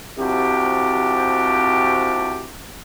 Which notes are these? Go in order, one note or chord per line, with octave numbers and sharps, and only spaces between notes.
C2 C3 F3 D4 F#4 G4